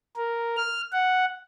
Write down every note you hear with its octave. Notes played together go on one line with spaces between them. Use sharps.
A#4
F6
F#5